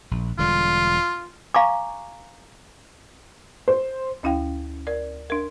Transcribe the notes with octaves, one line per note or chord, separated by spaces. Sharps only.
A#1
E1 D3 G3 F4
F5 G#5 A#5 C#6 D6
C5
D2 C#4 E4 F5 G5
A#4 D5
D4 A#4